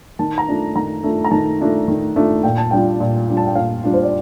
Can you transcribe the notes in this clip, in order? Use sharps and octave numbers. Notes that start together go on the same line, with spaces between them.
D#3 A5
A#5
A3 D4 F4
D#3 A#5
A3 D4 F4
A#5
D#3 A5
A3 D4 F4
D#3
A3 D4 F4
A#2 G5
A5
G3 D4 F4 G5
A#2
G3 D4 F4
A5
G5
A#2 F5
G3 D4 F4
C5
D5